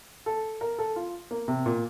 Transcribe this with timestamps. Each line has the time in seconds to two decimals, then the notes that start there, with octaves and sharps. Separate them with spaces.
0.26 A4
0.61 A#4
0.79 A4
0.96 F4
1.31 A#3
1.48 C3
1.66 A#2